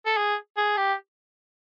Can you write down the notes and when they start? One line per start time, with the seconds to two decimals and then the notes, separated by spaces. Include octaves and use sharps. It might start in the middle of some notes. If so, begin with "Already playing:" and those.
0.06 A4
0.17 G#4
0.57 G#4
0.77 G4